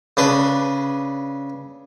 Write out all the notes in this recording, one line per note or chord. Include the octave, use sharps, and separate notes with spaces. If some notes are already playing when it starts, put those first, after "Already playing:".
C#3 D4 B4